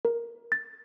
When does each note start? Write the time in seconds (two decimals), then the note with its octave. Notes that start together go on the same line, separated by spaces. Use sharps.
0.05 A#4
0.52 A6